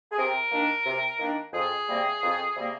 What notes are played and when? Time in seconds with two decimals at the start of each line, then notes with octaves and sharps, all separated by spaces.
0.12 G#4
0.17 C3 A#4
0.51 D#3 A#3 D4
0.85 C3
1.19 D#3 A#3 D4
1.53 F2 G#4
1.88 C3 G3 A#3
2.22 F2
2.56 C3 G3 A#3